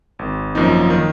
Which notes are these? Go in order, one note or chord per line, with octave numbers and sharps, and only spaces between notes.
G#1
F#2 F3 A#3 D#4
D#3